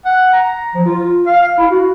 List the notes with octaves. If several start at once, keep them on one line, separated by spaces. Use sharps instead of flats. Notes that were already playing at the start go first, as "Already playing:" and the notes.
F#5
A#5
F3
F4
F5
E4
F#4